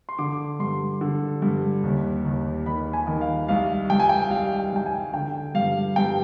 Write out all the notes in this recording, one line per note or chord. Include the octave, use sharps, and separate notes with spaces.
C6
D3 D6
G2 C6
D3
G2
D#2
D#2
D#3 B5
G#5
D#3
F5
C2 F5
C2 G5
G#5
G5
G3 F5
G5
C2 G5
G#5
D3 G5
G2 F5
G2 G5